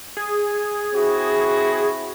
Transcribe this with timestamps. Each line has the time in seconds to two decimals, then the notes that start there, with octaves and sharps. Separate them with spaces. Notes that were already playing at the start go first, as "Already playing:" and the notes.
0.17 G#4
0.93 C4 E4 F#4